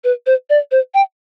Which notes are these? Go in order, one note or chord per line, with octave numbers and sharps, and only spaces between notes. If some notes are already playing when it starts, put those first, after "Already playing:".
B4
C5
D5
C5
G5